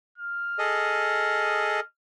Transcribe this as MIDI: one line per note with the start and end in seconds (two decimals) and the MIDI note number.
0.18 1.85 89
0.59 1.80 68
0.59 1.80 69
0.59 1.80 75